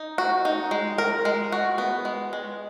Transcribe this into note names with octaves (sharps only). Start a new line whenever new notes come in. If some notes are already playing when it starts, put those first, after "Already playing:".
Already playing: D#4
F#4
D#4
G#3
A#4
G#3
F#4
B3
G#3
G#3